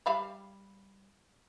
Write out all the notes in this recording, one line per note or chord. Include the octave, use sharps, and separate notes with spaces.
G3 F5 B5